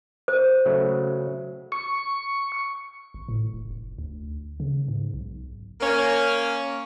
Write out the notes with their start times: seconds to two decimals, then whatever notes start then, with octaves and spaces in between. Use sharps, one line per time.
0.28 C5
0.65 C#3 F#3 A3
1.72 C#6
3.14 G1
3.28 A2
3.53 F1
3.71 F1
3.98 D2
4.60 C#3
4.88 G#2
5.14 B1
5.81 A#3 C#4